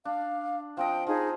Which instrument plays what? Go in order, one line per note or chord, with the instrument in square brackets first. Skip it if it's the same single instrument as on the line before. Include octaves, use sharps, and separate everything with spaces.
[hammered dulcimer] D4 [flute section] F5
[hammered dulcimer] F3 C4 D#5 [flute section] G5
[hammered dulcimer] F3 [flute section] D#4 G#4